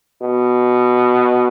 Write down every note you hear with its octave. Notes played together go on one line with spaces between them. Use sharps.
B2